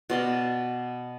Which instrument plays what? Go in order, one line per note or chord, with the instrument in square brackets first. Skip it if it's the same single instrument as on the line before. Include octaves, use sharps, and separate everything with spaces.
[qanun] B2 D5 D#5 F5